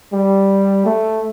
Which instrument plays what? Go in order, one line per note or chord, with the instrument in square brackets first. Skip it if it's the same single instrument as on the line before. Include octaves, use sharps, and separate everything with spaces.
[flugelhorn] G3
A3